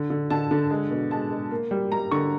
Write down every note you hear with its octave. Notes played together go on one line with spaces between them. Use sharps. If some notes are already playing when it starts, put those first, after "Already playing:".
Already playing: D3
D3
D3 A5
D3
G#3
B2
G#3 A5
G#3
A#3
G3
G3 A#5
D3 C#6